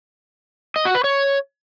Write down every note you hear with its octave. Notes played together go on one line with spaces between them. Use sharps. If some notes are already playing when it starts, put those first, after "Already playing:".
D#5
F#4
B4
C#5